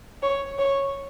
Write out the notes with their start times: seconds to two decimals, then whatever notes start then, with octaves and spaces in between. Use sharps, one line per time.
0.22 C#5
0.59 C#5